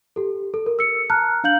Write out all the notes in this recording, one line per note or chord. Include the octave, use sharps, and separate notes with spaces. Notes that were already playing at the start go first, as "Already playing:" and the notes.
G4 A4
A4
A#4
E6 C#7
A5 A#5 F6 F#6
D4 F5 G6 F#7